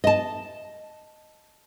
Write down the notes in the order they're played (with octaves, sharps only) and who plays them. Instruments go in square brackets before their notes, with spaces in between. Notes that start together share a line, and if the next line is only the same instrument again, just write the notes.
[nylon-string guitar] D#5 A5